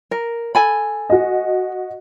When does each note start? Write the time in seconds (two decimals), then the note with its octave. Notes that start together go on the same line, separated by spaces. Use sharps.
0.11 A#4
0.55 A4 G#5 B5
1.10 F#4 D#5